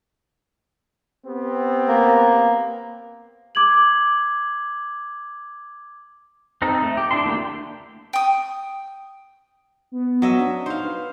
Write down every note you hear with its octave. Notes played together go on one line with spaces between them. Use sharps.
B3 C4 G4
A#3
D6 G#6 F#7
C4 D#4 A4
A3
G4
D4 E4 A5 C6
A3 A#3 F#4 G4
G5 D#6
B3
F#3 D#5 E5
D4
D#4 C5 F5
B4